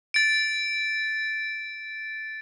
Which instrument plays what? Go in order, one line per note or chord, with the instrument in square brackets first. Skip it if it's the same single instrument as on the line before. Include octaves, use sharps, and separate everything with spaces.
[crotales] A6 D7